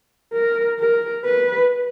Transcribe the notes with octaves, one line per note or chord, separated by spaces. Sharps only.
A#4
A#4
B4